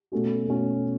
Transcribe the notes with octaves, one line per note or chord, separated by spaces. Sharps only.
B2 A3 C#4 F#4
B2 A3 C#4 F#4